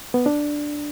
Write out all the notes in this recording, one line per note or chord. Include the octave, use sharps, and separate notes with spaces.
B3
D4